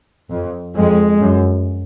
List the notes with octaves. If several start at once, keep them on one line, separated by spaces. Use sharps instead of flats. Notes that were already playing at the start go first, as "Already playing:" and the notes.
F2
F2 G#3
F#2